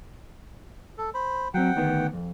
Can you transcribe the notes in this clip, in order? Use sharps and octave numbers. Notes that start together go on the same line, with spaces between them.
A4
C5 B5
F#3 C4 F#5 G5
D2 D#3 B3
F2